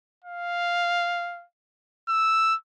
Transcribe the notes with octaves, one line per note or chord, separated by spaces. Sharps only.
F5
E6